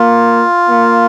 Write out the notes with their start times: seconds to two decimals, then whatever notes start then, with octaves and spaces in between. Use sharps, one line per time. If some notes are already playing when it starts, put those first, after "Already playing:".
Already playing: A#3 F4
0.69 A#3